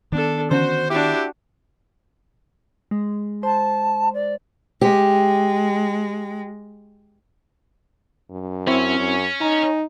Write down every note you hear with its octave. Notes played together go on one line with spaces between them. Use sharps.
D#3 B3 D4 A4
D3 E3 C#4 F#4 C5
D4 E4 F#4 G4
G#3
C5 A5
D5
G#3 G4
F#2
C4 C#4 E4
F#2
D#4 G#5 A#5